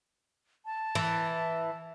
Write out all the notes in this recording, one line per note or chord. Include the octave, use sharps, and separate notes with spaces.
A5
E3